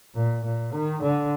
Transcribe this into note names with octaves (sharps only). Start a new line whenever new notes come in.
A#2
A#2
D#3
D3